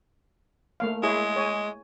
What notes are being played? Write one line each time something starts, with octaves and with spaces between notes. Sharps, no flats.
A3 A#3 F5
G#3 E4 G#4 C#5
C#5 G#5